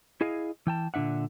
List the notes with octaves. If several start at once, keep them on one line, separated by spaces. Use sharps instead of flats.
E4 G#4 D#5 F5
E3 G5 A5
A#2 D3 D4 E5 F#5